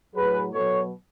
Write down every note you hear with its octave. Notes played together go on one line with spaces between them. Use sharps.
A2 F#3 G#4 B4
B2 F#3 A4 C#5